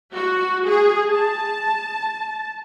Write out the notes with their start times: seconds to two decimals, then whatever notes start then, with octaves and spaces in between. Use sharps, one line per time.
0.13 F#4
0.66 G#4
1.11 A5